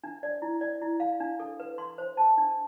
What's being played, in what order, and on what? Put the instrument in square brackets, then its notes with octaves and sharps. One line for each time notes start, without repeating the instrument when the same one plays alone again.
[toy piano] D4
D5
E4
D5
E4
F5
D4
A4
B4
C6
C5
A5
D4